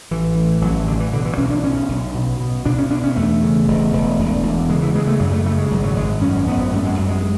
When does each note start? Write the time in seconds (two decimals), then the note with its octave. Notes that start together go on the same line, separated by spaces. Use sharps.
0.11 A1 E3
0.35 A2
0.61 A1 F#3
0.75 E3
0.87 A2 D3
1.00 E3
1.13 B2 D3
1.25 E3
1.37 B1 C#4
1.50 D4
1.64 B2 C#4
1.89 B1
2.15 B2
2.40 B2
2.65 B2 D4
2.78 C#4
2.90 B2 D4
3.04 C#4
3.16 E2 A3
3.42 C#3
3.68 E1
3.93 E1
4.19 E1
4.43 E2
4.69 C#3 G#3
4.82 E3
4.95 C#3 G#3
5.07 A3
5.19 F#2 F#3
5.33 A3
5.45 C#3 A3
5.58 G#3
5.70 G#1 F#3
5.84 F#3
5.96 G#1 G#3
6.21 F#2 C#4
6.47 G#1 B3
6.73 F#2 A3
6.85 G#3
6.97 F#2 F#3
7.08 G#3